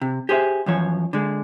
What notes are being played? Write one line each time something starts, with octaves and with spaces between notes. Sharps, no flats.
C3
G4 G#4 C5 C#5 E5
F#2 E3 F3 C#5
D3 G#3